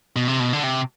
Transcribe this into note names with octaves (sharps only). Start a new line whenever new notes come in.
B2
C3
B2
D3
C3